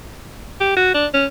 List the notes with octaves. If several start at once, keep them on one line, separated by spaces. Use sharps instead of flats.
G4
F#4
D4
C#4